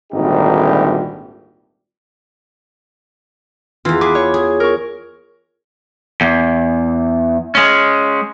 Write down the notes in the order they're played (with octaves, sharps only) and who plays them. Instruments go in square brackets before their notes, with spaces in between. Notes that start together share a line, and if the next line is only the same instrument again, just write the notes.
[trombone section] G#1 D2 A#2 G3 D#4 G4
[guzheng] E2 E3 [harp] F4
[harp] G#4 D6 [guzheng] B4
[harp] C#5
[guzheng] G#4
[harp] A#4 C#6
[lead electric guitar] E2
G#3 C#4